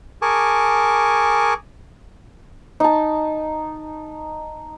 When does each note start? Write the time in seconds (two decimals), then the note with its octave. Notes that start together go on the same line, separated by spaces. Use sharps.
0.22 G#4 A#4 G#5 A5 C#6 D6
2.80 D#4 A5